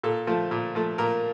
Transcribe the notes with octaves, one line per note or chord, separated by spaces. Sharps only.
A#2 A4
F3 A3
A#2
F3 A3
A#2 A#4